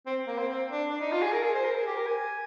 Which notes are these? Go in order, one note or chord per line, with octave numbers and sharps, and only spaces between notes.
C4
A#3
C4
C4
D4
D4
D#4
F4
G#4
A#4
G#4
C5
A#4
G#4
G4
A#4
G#5